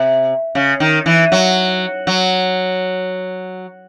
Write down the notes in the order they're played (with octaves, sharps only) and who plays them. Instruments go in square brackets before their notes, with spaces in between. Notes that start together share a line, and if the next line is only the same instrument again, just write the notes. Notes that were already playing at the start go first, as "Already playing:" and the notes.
Already playing: [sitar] C3
C#3
D#3
E3
F#3
F#3